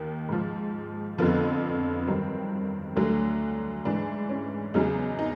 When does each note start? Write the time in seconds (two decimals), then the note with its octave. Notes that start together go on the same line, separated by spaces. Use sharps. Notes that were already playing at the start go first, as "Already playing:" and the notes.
Already playing: D#2 D#3
0.29 G#2 F3
1.18 F2 D3 F3 B3
2.07 G2 D#3 F#3 C4
2.96 D2 D3 F#3
3.85 G#2 E3 D4
4.30 C#4
4.74 E2 C#3 F#3 D#4
5.19 D#4